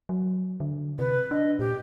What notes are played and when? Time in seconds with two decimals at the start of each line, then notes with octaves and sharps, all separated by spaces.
0.09 F#3
0.60 D3
0.99 C3 B4
1.31 D4 D#5
1.59 A#2 G4